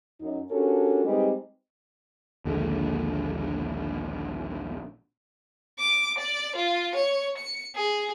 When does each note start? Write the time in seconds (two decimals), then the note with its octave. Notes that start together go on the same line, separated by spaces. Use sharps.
0.21 F#2 D#4
0.50 C#4 D4 F#4 G4 A4 A#4
1.05 G3 G#3 C4 D#4 B4 D#5
2.45 A#1 D#2 D3 G#3
5.79 D6
6.18 D5
6.56 F4
6.95 C#5
7.37 C#7
7.75 G#4